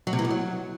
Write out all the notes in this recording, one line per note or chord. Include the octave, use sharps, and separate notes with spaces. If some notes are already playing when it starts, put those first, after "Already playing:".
F#3
C3
E3
E2
F#3